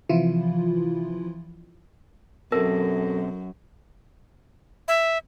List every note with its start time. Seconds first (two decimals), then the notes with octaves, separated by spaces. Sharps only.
0.09 C3 E3 F3 E4 F4
2.52 F#2 B2 C4 A4 A#4 A5 A#6
4.88 E5